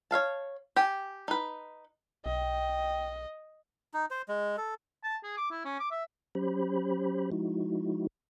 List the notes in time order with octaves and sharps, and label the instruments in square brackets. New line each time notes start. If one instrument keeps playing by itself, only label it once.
[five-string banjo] C#5 E5 F5 A5
G4 G5 G#5
D#4 B4
[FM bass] B1 [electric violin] D#5 [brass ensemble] G5
[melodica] D#4
C5
G#3
A4
[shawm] A5
G#4
D6
E4
C#4
D6
E5
[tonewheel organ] F#3 C#4 G4 C5 B5
F3 G#3 D#4 E4 F#4